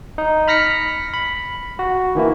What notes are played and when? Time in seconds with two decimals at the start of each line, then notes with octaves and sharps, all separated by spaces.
0.18 D#4
0.48 B5 F6 A#6 B6 C#7
1.14 B5
1.79 F#4
2.15 D#3 E3 A#3 E4